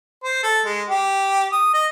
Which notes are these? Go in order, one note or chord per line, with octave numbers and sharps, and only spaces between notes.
C5
A4
G#3
G4
D#6
D#5